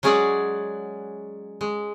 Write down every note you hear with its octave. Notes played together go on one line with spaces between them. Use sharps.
F#3 G#3 C#4 G#4 D5 F#5
G#3